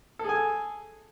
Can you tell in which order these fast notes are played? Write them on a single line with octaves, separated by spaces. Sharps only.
A4 G#4 G#5